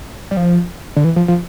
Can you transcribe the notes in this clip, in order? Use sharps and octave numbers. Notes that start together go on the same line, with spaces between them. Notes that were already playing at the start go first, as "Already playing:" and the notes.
G3
F3
D3
E3
F3
F3